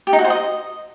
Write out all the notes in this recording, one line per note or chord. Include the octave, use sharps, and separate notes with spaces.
G4
D#4
F#4
C5
D#5